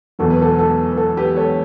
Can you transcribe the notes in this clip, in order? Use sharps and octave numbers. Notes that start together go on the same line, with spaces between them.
E2 B2 F#3 A4
B4
A4
A4
B4
A4
G4 B4
A4 C#5